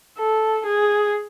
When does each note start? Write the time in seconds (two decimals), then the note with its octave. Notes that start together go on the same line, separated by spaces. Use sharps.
0.18 A4
0.66 G#4